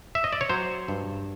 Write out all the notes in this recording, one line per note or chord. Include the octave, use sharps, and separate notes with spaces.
E5
D#5
D5
C#5
F#3 C5
G2